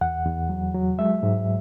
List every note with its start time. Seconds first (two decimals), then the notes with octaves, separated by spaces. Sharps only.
0.01 E2 F#5
0.25 E2
0.49 F#3
0.75 F#3
0.99 G#3 E5
1.23 G#2